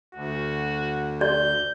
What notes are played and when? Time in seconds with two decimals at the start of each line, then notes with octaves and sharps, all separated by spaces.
0.15 D2 F#4
1.21 D5 G6